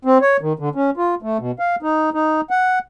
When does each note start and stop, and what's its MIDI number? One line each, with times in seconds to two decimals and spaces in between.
0.05 0.18 60
0.22 0.37 73
0.41 0.53 51
0.59 0.69 50
0.75 0.90 61
0.97 1.15 65
1.22 1.37 57
1.39 1.51 47
1.59 1.76 77
1.82 2.10 63
2.14 2.41 63
2.50 2.79 78